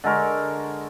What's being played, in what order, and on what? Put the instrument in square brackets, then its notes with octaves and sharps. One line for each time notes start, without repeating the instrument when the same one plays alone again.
[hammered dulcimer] D3 G#3 A#4 C#6